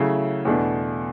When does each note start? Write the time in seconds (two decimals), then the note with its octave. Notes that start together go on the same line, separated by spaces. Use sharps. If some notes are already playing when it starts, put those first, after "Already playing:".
Already playing: C#3 F#3 A3 E4
0.45 E2 B2 A3 D4